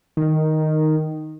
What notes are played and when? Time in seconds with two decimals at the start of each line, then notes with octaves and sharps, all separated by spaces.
0.17 D#3